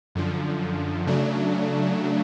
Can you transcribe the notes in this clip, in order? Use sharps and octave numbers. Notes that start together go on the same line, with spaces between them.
F#2 D3 F3
C#3 F#3 A3 D4